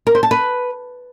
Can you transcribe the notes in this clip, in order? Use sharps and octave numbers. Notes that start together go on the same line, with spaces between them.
A#4
C5
A5
B4